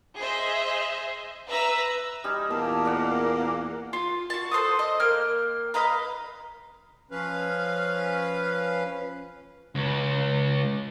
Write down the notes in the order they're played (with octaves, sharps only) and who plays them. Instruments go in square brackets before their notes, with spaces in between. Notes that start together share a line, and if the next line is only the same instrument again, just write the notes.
[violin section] G#4 C5 D#5 E5
B4 E5 A#5 E6
[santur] G3 D#4 G#5
[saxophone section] E2 A#2 A#3 [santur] A5
[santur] A#4 D5 F#5
[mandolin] F4
F#4 A5
A4 C5 F#5 D#6
D#5
A#3 G5 F6
B4 D#5 F5 A#5
[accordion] F3 C#4 B4 F5
[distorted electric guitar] C#2